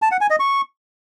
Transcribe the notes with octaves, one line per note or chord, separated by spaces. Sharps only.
A5
F#5
G#5
D#5
C#6